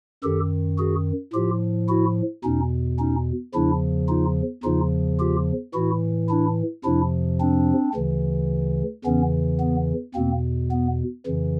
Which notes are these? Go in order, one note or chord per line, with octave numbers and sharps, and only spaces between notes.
F#2 D#3 G4 A4
F#4 G#4
A2 F3 F4 G4
E4 F#4
E2 B2 C#4 D#4
C#4 D#4
E2 C#3 F3 D4 E4
D#4 F4
E2 C#3 F3 D#4 F4
F4 G4
A2 E3 E4 F#4
D4 E4
F2 C3 F3 D4 E4
C4 D4
D2 C#3 E3
E2 C#3 E3 B3 C#4
B3
E2 B2 A#3 C4
B3
F2 C#3 E3